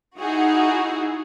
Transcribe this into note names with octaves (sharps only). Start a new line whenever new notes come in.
D#4 E4 F#4 G#4